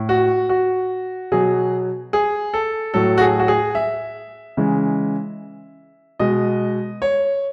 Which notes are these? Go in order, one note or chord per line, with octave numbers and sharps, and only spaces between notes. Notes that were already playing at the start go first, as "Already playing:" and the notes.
Already playing: A2
F#4
F#4
B2 F#3 G#4
G#4
A4
A2 F#3 A4
F#4
G#4
F#4
G#4
E5
C#3 E3 G#3
B2 G#3 D#5
C#5